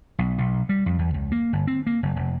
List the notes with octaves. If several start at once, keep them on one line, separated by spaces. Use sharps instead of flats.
B1
B1
G3
F2
E2
C#2
A#3
G1
C4
A#3
F#1
F1